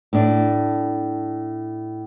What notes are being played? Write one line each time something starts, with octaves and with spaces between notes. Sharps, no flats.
A2 D4